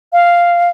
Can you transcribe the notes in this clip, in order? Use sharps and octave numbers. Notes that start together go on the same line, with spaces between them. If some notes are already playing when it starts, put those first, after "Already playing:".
F5